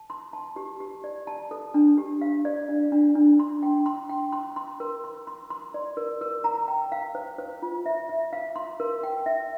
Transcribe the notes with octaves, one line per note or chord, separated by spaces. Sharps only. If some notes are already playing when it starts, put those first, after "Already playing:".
Already playing: A5
C6
A5
G4
G4
D5
A5
A4
D4
G4
F5
D5
D4
D4
D4
C6
G5
C6
G5
C6
C6
A#4
C6
C6
C6
D5
A#4
A#4
A#5
G5
F5
C5
C5
F4
E5
E5
F5
C6
A#4
G5
E5